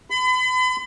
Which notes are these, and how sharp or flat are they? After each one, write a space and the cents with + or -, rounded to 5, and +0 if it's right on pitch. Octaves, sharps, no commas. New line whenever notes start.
B5 +40